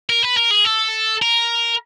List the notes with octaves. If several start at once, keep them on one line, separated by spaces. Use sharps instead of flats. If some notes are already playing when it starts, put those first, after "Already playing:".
A#4
B4
A#4
G#4
A4
A#4